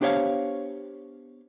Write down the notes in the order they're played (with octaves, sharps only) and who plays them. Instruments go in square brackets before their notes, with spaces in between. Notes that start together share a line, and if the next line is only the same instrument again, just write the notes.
[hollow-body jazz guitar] B3 D4 G4 C5 C#5 F5